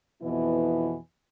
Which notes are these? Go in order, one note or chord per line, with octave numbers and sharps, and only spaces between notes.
F2 B2 E3 B3 E4